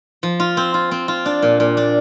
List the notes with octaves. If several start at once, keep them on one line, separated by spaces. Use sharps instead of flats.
F3
F4
C4
F4
C4
F4
D4
A#2
A#2
D4